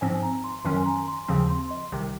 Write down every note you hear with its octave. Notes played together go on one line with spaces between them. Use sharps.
G#2 F3 C4 G#5
A#5
C6
F#2 D#3 F#3 C#4 C6
G#5
A#5
C6
D#2 C#3 F3 C4
C6
D#5
C2 C3 D#3